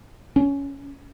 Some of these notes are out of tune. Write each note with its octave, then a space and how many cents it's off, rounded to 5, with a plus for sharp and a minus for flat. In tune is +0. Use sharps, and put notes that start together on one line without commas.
C#4 +15